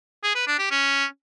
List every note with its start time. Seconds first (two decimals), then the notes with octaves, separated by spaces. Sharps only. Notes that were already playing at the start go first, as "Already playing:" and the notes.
0.23 G#4
0.35 B4
0.47 D4
0.59 G4
0.71 C#4